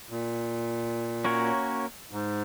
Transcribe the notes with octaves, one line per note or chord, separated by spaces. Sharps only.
A#2
A#3 C#4 F#4 A#4 C#5
G#2